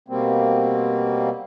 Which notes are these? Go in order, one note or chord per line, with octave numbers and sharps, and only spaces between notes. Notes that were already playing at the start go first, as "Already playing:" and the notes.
B2 G3 A#3 C4